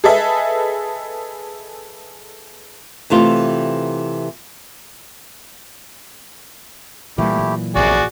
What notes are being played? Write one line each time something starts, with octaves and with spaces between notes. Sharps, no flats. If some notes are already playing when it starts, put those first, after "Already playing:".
G#4 A4 B4 D#5 E5
C3 E3 A3 F4
A#2 E3 G3 A3 B3 E4 G4
F#3
A#1 F#2 C3 F#4 G#4 D5